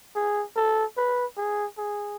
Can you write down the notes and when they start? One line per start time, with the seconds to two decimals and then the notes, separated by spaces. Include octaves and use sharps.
0.15 G#4
0.56 A4
0.97 B4
1.37 G#4
1.78 G#4